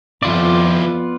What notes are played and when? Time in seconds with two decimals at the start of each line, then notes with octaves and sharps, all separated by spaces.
0.23 F2 F3 B3 E4 F4 D5